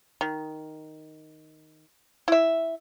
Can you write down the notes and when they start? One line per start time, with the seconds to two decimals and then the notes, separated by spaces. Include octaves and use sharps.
0.21 D#3
2.28 E4 E5